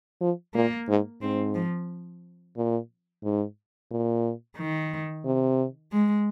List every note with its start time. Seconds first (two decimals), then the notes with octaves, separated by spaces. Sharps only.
0.21 F3
0.54 A#2 A#3
0.89 G#2
1.21 G#2 C4
1.55 F3
2.57 A#2
3.23 G#2
3.91 A#2
4.58 D#3
5.25 C3
5.93 G#3